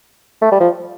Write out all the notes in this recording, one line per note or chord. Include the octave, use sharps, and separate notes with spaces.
A3
G3
F3